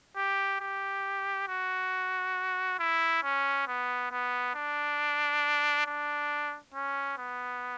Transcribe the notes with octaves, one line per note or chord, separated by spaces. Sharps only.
G4
G4
F#4
E4
C#4
B3
B3
D4
D4
C#4
B3